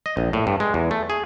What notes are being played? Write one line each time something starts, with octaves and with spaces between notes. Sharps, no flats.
D#5
A#1
A2
G2
G#3
E2
A3
G#4